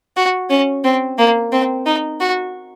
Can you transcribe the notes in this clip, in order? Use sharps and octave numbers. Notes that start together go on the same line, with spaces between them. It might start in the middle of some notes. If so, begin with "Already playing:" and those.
F#4
C#4
C4
A#3
C4
D#4
F#4